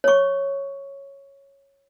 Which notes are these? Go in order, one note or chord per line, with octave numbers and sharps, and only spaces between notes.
C#5 C#6